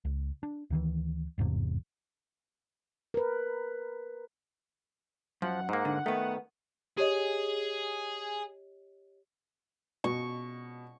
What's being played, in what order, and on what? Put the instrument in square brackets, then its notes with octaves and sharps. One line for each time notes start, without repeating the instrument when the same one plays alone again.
[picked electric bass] C#2
D4
D2 D#3 E3
G1 E2 G#2 C3
[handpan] A#4 B4
[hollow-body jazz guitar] F#2 [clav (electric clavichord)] F3 [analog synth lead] F#5
[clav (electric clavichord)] G#2 A#3
[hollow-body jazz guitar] D3
[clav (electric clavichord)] D#3 [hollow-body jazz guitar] A3 B3
[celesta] G4 C#5 D#5 [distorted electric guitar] G#4
[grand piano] B2 [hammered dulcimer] C#6